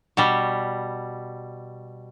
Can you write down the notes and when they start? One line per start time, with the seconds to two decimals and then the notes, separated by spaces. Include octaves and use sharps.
0.17 B2 G3